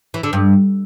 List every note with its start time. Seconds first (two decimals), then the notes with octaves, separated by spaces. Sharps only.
0.14 E3
0.23 D3
0.33 G2